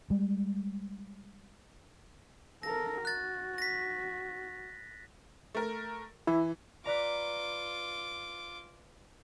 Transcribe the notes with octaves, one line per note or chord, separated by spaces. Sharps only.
G3 G#3
A4 A#4 A#6
F#4 F#6 A6
A#6 B6
A3 A#4
E3 E4
F4 B4 D5 A#5 D6